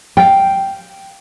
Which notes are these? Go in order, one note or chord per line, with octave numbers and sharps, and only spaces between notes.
F5 G5